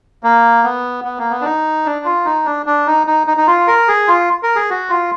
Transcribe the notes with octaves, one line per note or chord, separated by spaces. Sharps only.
A#3
B3
B3
A#3
B3
D4
D#4
D4
F4
D#4
D4
D4
D#4
D#4
D#4
D#4
F4
A#4
G#4
F4
A#4
G#4
F#4
F4